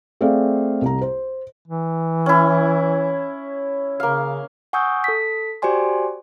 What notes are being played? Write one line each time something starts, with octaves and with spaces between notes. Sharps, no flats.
A3 C4 G#4 D5 F5
C2 A#5
C5
E3
C#4 E4
C#3 A#3 F5
F#5 G#5 C#6 D#6 E6 G6
A4 B6
F#4 G4 C5 D5 G#5 C6